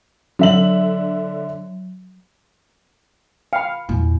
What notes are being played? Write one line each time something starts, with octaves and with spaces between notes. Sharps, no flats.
D3 F#3 E5 F#7
F5 G5 B5
E2 A#2